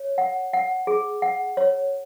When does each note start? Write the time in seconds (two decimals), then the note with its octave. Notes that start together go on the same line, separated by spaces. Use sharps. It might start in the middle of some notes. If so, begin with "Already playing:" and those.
Already playing: C#5
0.18 F#5
0.53 F#5
0.87 G#4
1.22 F#5
1.57 C#5